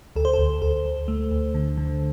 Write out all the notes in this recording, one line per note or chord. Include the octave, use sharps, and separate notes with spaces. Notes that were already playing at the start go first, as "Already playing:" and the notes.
D2 A4
C5
D2 A4
D2 A4
D2
A3
D2
D3
D3